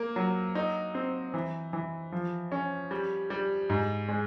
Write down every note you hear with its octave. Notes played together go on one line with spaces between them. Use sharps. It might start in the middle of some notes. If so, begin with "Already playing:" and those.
Already playing: A#3
F#3
D#4
C4
E3
E3
F3
C#4
G3
G3
G#2
G#3